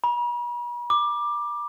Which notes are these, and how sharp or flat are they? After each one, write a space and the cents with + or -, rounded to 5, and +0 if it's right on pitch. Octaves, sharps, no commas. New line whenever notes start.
B5 -45
D6 +15